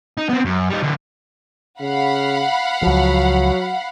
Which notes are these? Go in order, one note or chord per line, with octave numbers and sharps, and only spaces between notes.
D#4
B3 C4
F#2
G3 D#4
D3 E3
C#3 F5 F#5 B5
C#2 F3 F#3